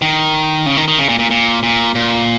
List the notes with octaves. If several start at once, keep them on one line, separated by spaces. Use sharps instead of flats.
D#3
C#3
D#3
D#3
C#3
A#2
A#2
A#2
A#2
A#2